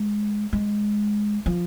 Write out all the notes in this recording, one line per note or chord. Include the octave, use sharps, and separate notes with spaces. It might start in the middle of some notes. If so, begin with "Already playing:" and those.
Already playing: G#3
G#3
F3